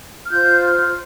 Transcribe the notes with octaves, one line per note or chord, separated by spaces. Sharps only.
F6
F4 C5 G6
F6